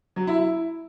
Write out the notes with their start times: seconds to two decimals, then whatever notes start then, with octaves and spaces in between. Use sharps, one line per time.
0.16 F#3
0.27 E4
0.38 E4